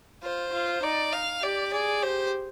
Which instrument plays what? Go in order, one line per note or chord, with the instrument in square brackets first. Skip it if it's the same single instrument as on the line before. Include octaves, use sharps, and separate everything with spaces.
[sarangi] F4 [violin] C5
[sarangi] F4
[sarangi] D#4 [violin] D5
[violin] F5
[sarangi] G4 [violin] D5
[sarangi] G#4 [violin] D5
[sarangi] G4 [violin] C5